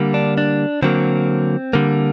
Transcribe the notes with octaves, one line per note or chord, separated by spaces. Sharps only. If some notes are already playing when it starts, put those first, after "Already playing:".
Already playing: D3 G3 A#3
D4
D4
D3 F#3 A#3 C4
D3 G3 A#3